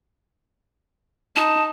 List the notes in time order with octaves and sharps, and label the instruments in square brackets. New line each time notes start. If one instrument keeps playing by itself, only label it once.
[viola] D#4 [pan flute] A5